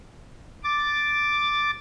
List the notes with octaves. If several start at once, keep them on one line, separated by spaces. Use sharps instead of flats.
D6 A6